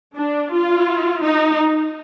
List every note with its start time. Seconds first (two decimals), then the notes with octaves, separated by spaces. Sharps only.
0.16 D4
0.53 F4
1.24 D#4